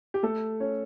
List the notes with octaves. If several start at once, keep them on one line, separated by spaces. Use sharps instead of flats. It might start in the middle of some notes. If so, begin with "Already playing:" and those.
G4
A3 A4
C#4 C#5